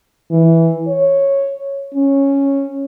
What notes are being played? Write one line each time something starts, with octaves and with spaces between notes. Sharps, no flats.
E3
C#5
C#4